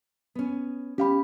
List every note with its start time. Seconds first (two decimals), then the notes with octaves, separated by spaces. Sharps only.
0.35 B3 C#4
0.98 C#4 G4 F5 B5